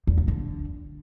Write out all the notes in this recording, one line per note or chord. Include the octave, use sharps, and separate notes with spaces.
E2
C#3
D3